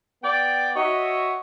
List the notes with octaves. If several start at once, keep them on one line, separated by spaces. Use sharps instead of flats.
B3 D5 G5
F#4 C#5 D#5 E5